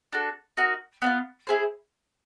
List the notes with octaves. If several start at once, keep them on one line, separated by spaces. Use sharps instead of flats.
D4 F#4 A4
D#4 F#4 A#4
B3 D4 F4
E4 G#4 C5